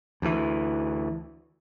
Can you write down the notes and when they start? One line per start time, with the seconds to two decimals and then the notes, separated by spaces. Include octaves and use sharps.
0.22 D2 E3